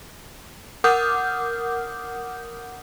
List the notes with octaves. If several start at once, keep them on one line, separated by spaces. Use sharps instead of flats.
A#4 F#5 D6 D#6 F6 G6